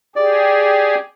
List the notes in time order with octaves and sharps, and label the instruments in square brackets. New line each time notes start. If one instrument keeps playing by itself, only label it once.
[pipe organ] G4 G#4 [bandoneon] D5